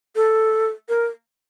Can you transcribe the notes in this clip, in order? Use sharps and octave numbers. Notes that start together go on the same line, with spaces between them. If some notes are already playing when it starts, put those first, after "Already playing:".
A4
A#4